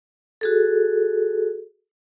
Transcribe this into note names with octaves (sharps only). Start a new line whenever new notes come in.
F#4 G#4 A4